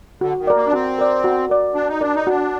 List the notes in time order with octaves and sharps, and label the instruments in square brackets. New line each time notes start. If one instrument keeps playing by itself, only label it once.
[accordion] D3 [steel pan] F#4
[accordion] D#3
[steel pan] A#4 D5
[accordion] A#3
D4
[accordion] C4 [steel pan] F#4
[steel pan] A#4 D5
F#4
A#4 D5
[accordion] D4 [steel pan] F#4
[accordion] D#4
[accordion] D4 [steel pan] A#4 D5
[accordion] D#4
[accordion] D4 [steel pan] F#4